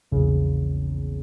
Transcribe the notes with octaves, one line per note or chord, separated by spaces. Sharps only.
A#1 E2 C#3